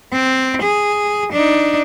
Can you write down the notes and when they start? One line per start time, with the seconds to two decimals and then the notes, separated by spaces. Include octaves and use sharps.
0.13 C4
0.62 G#4
1.32 D4 D#4